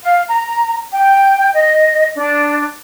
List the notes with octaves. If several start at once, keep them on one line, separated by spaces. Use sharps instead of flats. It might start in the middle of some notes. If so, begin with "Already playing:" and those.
F5
A#5
G5
D#5
D4